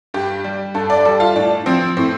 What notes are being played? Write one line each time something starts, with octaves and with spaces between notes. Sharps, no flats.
G2 G4
G3
G2 A4
D5
G3 A4
F4
A2 D4
F3 C4
A2 C4